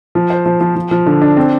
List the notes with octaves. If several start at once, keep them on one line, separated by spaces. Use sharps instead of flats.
F3
C5
F3
F3
F3
F3
D3
D4
C4